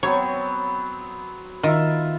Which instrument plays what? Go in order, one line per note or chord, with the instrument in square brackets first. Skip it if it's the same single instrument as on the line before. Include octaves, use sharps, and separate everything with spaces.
[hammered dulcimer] F#3 B3 C4 [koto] C#5
[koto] D#3 [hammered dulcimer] F4 E5